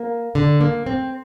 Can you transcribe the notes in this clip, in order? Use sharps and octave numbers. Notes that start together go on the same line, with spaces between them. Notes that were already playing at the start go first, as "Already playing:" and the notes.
Already playing: A#3
D3
A#3
C4